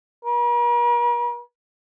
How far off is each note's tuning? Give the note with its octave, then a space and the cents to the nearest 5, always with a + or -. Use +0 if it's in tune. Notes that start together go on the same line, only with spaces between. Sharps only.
A#4 +45